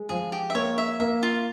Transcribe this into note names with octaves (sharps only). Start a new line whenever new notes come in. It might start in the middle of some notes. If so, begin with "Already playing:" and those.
Already playing: G#3
F3 G#4
G4
E5
A#3 C#5
E5
A#3 E5
F4